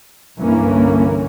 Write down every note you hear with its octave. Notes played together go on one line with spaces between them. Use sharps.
C2 G2 D3 E3 A#3 C#4